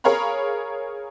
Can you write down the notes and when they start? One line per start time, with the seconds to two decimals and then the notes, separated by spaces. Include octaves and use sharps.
0.04 G#4 A#4 C#5 F5 A#5 B5